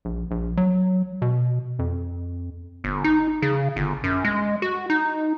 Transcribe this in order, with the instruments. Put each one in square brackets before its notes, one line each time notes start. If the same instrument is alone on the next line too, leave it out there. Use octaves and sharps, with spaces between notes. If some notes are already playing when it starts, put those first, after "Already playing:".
[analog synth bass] A#1
A#1
F#3
B2
F2
[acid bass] G1
D#4
C#3
G1
F#2
G#3
F#4
D#4